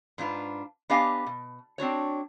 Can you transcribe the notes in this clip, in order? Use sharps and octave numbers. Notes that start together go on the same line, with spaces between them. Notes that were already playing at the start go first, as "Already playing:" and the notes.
G#2 D4 F4 B4
B3 D4 G4 D#5 F5 G#5
B2
C4 D4 F#4 C#5